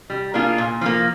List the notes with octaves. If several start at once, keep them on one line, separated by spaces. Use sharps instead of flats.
G3
A#3 D4 F4 G#4
A#2
F3 A#3